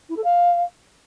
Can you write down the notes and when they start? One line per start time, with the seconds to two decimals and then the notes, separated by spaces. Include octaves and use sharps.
0.09 E4
0.17 A4
0.24 F5